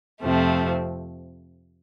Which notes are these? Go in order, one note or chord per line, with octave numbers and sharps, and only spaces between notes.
F2 C3 F3 A3 C4